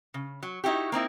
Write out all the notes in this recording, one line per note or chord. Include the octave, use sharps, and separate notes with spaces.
C#3
F#3
D#4 E4 F#4 G4
A#3 C4 D#4 E4